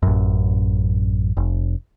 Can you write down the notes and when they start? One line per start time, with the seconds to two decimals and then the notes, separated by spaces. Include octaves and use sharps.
0.03 A1 F#2
1.37 F1